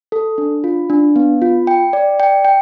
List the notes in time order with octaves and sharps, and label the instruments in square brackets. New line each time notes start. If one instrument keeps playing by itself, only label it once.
[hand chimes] A4
D4
F4
D4
B3
F4
G5
D5
G5
G5